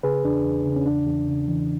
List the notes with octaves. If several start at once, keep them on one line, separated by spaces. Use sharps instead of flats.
C#3 G#4 B4
E2 D4
E2
C#3
C#4
E2 D4
E2
C#3
E3